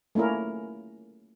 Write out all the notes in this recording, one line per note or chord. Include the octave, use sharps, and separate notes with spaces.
A3 A#3 C#4 E4 A#4